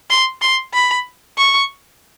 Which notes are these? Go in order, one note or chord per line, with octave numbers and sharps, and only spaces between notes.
C6
C6
B5
C#6